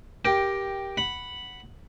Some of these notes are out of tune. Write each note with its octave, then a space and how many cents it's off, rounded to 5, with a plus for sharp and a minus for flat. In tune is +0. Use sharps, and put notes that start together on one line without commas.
G4 +0 A#4 +20 G5 +0
F#5 +0 B5 +0